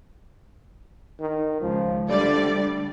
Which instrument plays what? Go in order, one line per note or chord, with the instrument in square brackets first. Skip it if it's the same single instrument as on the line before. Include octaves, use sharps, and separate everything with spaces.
[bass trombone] D#3
[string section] C#2 [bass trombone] F3
[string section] D3 G3 D5 [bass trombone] A3